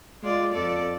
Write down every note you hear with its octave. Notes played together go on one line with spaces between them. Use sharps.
G#3 F4 D5
F2 A4 D5